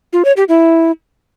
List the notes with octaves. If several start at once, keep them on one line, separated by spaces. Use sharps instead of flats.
F4
C#5
G4
E4